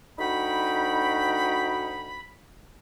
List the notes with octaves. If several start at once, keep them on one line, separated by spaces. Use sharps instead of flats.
D2 D#4 F#4 F#5 G5 B5